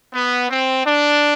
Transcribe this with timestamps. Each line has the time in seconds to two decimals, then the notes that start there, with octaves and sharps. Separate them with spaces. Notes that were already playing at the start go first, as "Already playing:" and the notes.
0.13 B3
0.50 C4
0.86 D4